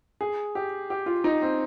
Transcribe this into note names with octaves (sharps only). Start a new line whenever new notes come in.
G#4
G4
G4
F4
D#4
C4